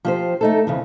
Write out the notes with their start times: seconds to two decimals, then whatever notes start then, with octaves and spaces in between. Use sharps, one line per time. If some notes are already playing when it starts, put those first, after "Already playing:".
0.05 F3 G4 C5
0.41 A3 D#4 A4
0.67 F2 C#3 E3